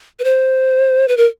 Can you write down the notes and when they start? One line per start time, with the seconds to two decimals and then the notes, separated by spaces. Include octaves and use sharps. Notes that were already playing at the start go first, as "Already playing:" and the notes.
0.19 B4
0.24 C5
1.08 B4
1.17 A#4